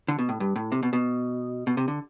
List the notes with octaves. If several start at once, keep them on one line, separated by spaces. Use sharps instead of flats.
D3
B2
A2
G2
A2
C3
B2
B2
B2
C3
D3